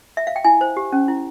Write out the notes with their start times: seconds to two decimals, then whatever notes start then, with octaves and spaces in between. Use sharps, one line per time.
0.17 E5
0.27 F5
0.36 G5
0.44 E4 G#5
0.61 C5
0.77 G4
0.92 C#4
1.08 E4